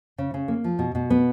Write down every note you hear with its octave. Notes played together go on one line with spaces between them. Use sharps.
C#3
C#3
A#3
F3
B2
B2
B3